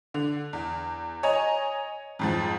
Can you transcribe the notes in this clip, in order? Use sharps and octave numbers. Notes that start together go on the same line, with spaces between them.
D3
E2
C#5 D#5 G#5 A#5
F2 G#2 F3